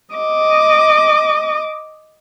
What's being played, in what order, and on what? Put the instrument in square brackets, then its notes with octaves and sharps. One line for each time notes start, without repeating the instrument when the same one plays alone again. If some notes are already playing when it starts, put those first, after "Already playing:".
[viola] D#5 D6